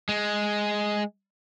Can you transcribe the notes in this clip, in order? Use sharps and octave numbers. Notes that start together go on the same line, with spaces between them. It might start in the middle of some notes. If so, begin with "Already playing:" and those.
G#3